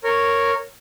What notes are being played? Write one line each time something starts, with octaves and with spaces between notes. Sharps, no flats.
A#4 C#5